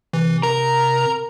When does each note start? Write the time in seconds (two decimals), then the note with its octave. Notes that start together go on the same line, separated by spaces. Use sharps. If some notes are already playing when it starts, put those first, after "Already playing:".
0.13 C3 E3
0.43 A#4 A#5